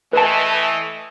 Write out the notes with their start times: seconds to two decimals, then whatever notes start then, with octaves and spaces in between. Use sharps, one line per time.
0.13 E3 A3 B4 D#5 A5